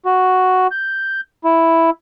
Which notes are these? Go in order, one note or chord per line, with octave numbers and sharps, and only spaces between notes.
F#4
G6
E4